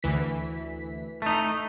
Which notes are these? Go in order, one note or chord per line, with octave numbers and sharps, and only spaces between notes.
D2 E3 B6
A3 D#4